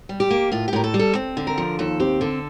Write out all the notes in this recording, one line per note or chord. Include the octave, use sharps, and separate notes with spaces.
G3
G4
A#3
A2 F4
G4
A2 A#4
A4
G3
A4
C4
D3
A#4
F3
D#2 A4
C4 G4
D3 A4